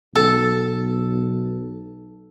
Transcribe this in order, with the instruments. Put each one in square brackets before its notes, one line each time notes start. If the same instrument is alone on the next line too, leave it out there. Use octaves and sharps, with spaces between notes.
[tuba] B1 [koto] A4